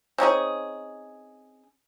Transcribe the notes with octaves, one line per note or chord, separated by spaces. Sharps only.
C4 C#4 D#4 G#4